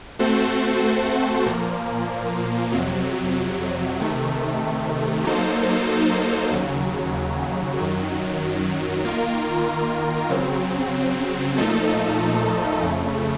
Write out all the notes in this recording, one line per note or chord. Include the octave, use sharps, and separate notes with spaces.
A3 C4 F#4 A4 C5
A#2 F3 A#3
F2 C3 F#3
C3 D#3 A3
F#3 A#3 D#4 A4 C5
D#2 C#3 F#3
F#2 D#3 F#3
D#3 A#3 F4 A#4
C#3 F#3 C4
A#2 F3 A3 D#4 A4
F2 C#3 A3